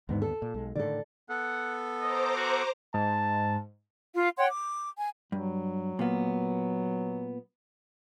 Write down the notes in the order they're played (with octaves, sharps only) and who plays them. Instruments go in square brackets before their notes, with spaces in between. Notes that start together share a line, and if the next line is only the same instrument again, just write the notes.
[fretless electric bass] D#2 D3 B3 [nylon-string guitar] G#2
[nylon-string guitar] A4
[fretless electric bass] A#2
B1 G#3
[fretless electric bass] A2 D3 D#3 [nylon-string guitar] A4 D5
[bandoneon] B3 A4 [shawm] F#5
[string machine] C5 A#5 D6 [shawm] D#5
[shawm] F#4
[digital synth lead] G#2 [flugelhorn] A5
[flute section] F4 F5
C#5 F#5 G5 C6
D6
G#5
[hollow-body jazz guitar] G2 [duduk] F#3
[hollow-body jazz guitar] A#2 A#3 B3